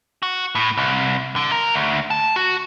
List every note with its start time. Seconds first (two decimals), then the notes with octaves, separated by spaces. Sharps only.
0.23 F#4
0.55 A2
0.77 C2
1.36 D3
1.52 A#4
1.74 D2
2.10 A5
2.36 F#4